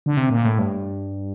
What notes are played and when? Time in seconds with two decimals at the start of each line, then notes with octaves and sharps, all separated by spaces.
0.06 D3
0.17 C3
0.30 A#2
0.45 A2
0.59 G2